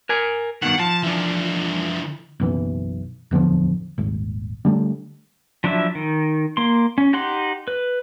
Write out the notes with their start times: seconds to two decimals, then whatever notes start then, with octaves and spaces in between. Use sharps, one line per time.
0.09 A#4 G#5
0.62 G2 B2 D#3 F#5
0.79 F3 A5
1.03 E3 D4
2.40 F#1 B1 E3
3.31 D1 E2 D3 F3
3.98 D#1 G#1
4.65 D3 G3 A3
5.64 F3 F#3 D4 E4 E5
5.95 D#3
6.57 A#3 C6
6.98 C#4
7.13 D#4 G4 F#5 C6
7.68 B4